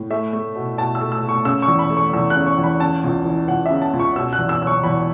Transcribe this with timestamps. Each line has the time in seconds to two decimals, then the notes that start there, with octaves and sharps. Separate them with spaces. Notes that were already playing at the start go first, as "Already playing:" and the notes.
Already playing: A2
0.10 A3 E5
0.33 A3
0.56 B2
0.78 B2 A5
0.95 E6
1.01 A3
1.12 E6
1.23 A3
1.29 C#6
1.45 C#3 E6
1.62 C#6
1.68 E2
1.79 B5
1.90 A3
1.97 C#6
2.13 E2 E6
2.30 F#6
2.36 C#3
2.46 C#6
2.58 E2
2.64 B5
2.80 C#3 A5
3.04 C#2
3.25 E3
3.48 C#2 F#5
3.66 C#3 E5
3.81 A5
3.93 C#2
3.99 C#6
4.16 B2 E6
4.33 F#6
4.39 E2
4.49 E6
4.61 F#3 E6
4.67 C#6
4.84 E2 B5